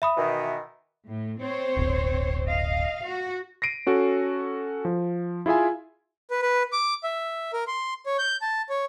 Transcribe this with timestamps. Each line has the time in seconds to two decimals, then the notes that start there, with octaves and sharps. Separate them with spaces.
0.02 E5 B5 D#6
0.17 B2 D#3 E3
1.07 A2
1.41 C4 C5 C#5
1.77 D1 G1
2.48 D#5 F5
3.06 F#4
3.62 A#6 C7 D7 D#7
3.87 C#4 F#4 A4
4.85 F3
5.46 E4 F4 G#4 E5 G#5
6.31 B4
6.42 B4
6.73 D6
7.04 E5
7.53 A#4
7.67 C6
8.06 C#5
8.19 G6
8.41 A5
8.70 C#5